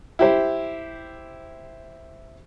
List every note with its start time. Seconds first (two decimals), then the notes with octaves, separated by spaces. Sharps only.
0.19 E4 G4 C5